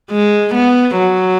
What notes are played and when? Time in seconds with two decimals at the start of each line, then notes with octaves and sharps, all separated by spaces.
0.11 G#3
0.55 B3
0.98 F#3